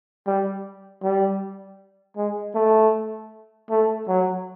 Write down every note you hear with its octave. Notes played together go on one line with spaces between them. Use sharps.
G3
G3
G#3
A3
A3
F#3